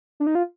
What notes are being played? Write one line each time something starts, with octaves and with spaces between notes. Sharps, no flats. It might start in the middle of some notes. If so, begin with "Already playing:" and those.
D4
D#4
F4